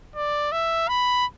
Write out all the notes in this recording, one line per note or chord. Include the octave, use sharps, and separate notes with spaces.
D5
E5
B5